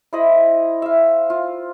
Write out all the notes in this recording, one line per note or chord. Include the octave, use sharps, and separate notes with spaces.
E4 C5 D#5 B5
E5 F5
F4